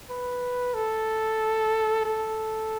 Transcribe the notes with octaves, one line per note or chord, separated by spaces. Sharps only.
B4
A4
A4